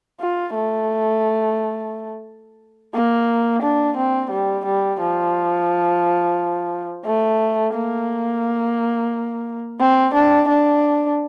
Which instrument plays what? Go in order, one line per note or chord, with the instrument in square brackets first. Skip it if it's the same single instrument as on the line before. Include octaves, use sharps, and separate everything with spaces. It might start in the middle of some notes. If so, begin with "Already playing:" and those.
[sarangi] F4
A3
A#3
D4
C4
G3
G3
F3
A3
A#3
C4
D4
D4